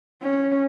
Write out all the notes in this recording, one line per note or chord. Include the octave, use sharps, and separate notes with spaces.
C#4